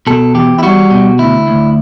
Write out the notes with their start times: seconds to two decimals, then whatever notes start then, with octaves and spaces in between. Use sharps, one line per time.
0.07 B2 A4
0.35 E2 G4
0.59 E4
0.63 G3 F#4
0.91 B2
1.19 D2 E4
1.47 D2